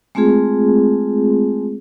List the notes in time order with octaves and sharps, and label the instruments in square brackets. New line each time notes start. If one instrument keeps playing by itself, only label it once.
[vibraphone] G#3 A3 C4 F4 G#4